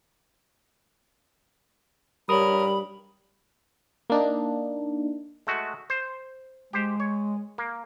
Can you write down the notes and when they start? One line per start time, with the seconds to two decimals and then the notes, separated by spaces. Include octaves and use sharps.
2.29 G3 A#4 C#5 B5 D#6
4.10 A#3 D4 D#4
5.47 G#3 A3 F#4
5.90 C5
6.73 G#3 G4 C5 G5
7.00 C#5
7.58 A#3